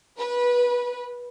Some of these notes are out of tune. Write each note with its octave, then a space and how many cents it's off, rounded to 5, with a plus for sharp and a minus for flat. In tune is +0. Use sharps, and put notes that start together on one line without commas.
B4 -20